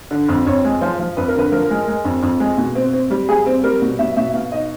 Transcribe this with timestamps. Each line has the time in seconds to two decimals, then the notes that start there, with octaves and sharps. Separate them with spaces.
0.11 D3
0.29 F2
0.46 F2 C#5
0.65 G#3
0.81 F3 C5
0.99 F3
1.17 F2 B4
1.28 A#4
1.35 D3 B4
1.52 F3 A#4
1.70 G#3
1.88 G#3
2.05 F2
2.23 F2
2.40 G#3
2.58 B2
2.75 C4
2.93 C4
3.10 G3
3.29 G3 G#4
3.46 C4
3.64 G3 A#4
3.82 B2
3.99 B2 E5
4.16 B2 E5
4.34 B2 F5
4.52 D#4 D#5